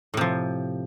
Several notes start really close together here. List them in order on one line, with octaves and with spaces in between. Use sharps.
A2 C3 F3